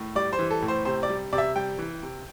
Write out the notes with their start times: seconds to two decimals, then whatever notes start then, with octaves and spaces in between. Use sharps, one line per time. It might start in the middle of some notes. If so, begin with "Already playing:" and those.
Already playing: A2
0.15 G3 D5
0.33 C5
0.39 E3
0.51 A4
0.62 A2
0.68 C5
0.85 C3 C5
1.03 D5
1.09 G3
1.33 C3 D5
1.38 E5
1.56 G3 G5
1.78 E3
2.02 C3